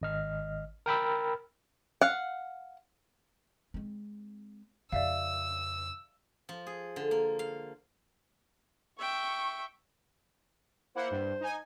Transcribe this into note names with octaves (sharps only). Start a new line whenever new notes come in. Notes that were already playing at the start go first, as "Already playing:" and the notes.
G#1 D#5 F6
A#4 G5 B5 E6
F5 F#5
G#3 C4
F2 C#3 D5 E5 F5 E6
F3
G#4
D3
A#3
F5
E5 G5 C#6
A#3 E4 C5 F#5
G2
D#4 G#5